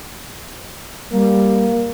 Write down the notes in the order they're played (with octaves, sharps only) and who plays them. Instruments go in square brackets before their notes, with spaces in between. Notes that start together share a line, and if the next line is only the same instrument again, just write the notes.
[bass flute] G3 [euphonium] A#3